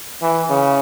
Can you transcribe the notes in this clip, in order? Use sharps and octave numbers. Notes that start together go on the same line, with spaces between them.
E3
C#3